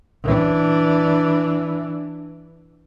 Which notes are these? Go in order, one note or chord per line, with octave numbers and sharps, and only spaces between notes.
E3 D4